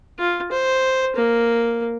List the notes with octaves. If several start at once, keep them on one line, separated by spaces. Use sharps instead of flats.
F4
C5
A#3